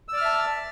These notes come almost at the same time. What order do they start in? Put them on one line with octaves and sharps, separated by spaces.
E6 D5 F6 E5 A5